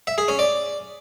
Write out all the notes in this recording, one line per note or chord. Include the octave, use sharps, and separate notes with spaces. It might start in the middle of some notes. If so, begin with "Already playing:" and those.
E5
G#4
C#4
D5